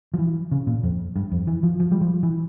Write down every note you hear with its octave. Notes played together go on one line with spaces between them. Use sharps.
F3
E3
C#3
A#2
F2
G2
F2
E3
F3
F3
G3
F3
E3